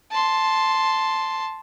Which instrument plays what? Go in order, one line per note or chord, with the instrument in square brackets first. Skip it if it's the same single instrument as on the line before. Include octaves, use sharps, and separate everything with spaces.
[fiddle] A5 C6